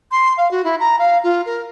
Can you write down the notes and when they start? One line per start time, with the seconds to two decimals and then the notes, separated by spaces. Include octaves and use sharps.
0.11 C6
0.37 F5
0.51 F#4
0.64 E4
0.80 A#5
0.99 F5
1.23 F4
1.46 A#4